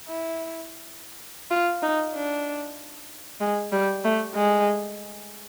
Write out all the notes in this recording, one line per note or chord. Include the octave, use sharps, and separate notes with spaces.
E4
F4
D#4
D4
G#3
G3
A3
G#3